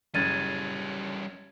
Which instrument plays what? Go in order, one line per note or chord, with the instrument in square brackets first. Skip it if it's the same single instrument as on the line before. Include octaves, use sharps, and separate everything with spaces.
[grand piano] F#1 [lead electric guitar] G3 C#4 [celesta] G#6 A6 D#7